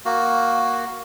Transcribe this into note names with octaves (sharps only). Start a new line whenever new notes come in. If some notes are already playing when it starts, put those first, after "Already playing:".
A#3 F#4